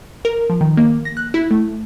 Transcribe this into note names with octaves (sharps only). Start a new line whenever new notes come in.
A#4
F3
D#3
A#3
A#6
F#6
E4
A3